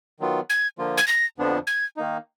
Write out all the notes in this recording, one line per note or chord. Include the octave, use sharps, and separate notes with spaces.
D#3 F#3 B3 F4
G#6
D3 F3 A#3 F4
G#6
A#6
F2 D3 F3 B3 D4
G#6
D#3 A#3 D#4